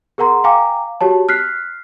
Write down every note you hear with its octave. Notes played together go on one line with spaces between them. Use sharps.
G#4 A#4 F#5 A#5 C6
F5 G5 G#5 A#5 D6
F#4 G4 C#5 A5
F6 F#6 B6 C7